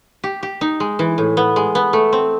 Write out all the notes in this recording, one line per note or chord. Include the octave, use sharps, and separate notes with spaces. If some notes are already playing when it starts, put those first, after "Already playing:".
G4
G4
D#4
G#3
E3
A2
B3
G#3
B3
A3
C4